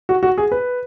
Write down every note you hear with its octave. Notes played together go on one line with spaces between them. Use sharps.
F#4
F#4
G#4
B4